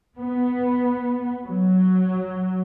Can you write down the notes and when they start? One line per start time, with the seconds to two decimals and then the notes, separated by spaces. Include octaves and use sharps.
0.19 B3
1.48 F#3